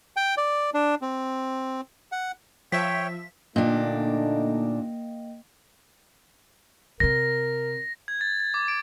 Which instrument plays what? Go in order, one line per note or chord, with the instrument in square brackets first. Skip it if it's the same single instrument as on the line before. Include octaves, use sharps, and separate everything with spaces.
[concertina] G5
D5
D4
C4
F#5
[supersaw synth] F3 E5 [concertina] C#5 G5 [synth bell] B6
[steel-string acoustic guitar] A#2 D4 [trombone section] D3 A3 D#4 [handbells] A#3 D#5 G5
[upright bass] C3 C4 [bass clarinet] A#4 [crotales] A#6
[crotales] G#6
A6
A6
D6
D7